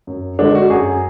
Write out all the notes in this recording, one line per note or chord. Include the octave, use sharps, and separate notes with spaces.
F#2
D3 G#3 D4
F#4
F#2 G#4